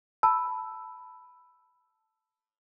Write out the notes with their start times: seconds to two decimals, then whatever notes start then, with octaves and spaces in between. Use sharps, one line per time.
0.23 A5 B5 E6